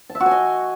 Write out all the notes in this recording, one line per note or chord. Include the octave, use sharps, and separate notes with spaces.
A5
E5
F#4
G#5
D#5